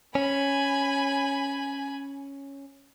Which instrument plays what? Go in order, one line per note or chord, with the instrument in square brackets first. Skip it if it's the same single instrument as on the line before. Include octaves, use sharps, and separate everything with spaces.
[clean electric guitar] C#4 [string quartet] G#5 B5